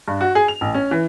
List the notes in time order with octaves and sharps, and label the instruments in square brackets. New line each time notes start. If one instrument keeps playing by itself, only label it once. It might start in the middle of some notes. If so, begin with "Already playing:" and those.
[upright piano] G2
F#4
G#4
F7
A1
C#4
E3